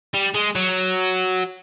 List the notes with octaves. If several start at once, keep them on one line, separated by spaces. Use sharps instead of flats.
G3
G#3
F#3